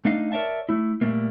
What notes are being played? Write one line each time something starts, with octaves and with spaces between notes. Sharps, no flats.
A3 D4 D#4 D#5 F5
A#4 C#5 D5 E5 A5
A3 E4
A#2 F3 G3 A3 A#3